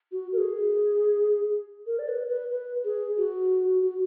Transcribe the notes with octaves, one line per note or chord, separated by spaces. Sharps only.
F#4
A#4
G#4
A#4
D5
B4
B4
B4
G#4
F#4
F#4